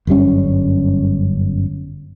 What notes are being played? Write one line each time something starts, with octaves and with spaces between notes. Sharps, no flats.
G1 F#2 G3 C#4